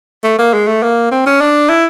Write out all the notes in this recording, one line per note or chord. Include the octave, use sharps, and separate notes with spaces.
A3
A#3
G#3
A3
A#3
C4
C#4
D4
E4